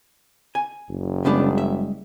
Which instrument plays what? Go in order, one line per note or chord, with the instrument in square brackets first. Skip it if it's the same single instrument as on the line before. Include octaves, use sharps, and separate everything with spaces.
[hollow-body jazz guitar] G#5
[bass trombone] F#1
[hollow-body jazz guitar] C#3 B3 D4 [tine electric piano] G3 G#3 G#4
[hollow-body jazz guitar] E5